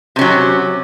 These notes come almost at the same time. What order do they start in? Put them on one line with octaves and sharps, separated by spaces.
C3 C#4 F#3